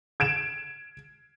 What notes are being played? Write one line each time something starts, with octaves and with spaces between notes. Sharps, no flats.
G#6 D7 E7